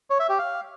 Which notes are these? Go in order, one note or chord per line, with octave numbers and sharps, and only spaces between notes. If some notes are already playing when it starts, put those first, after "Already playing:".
C#5
E5
G4
F5